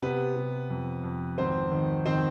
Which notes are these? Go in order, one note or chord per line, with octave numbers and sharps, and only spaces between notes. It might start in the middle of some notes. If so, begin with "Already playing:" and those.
C3 B3 B4
C3
F2
F2
G#1 C4 C5
D#3
D#3 C4 C5